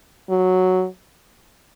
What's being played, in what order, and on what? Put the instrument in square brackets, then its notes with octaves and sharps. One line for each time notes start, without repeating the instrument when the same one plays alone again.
[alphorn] F#3